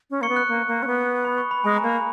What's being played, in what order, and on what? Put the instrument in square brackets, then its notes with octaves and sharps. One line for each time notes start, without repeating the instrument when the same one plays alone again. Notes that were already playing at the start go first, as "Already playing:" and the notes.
[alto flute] C#4
[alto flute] A#3 [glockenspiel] C#6 C#7
[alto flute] B3
[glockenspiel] F#6
[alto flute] A#3
A#3
C#4
B3
[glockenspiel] B5
C#6
B5
[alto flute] G#3 [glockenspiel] G#5
[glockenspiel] A#5
[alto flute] A#3
[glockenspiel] B5